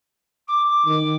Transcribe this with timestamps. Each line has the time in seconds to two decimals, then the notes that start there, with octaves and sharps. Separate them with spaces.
0.48 D6
0.86 D#3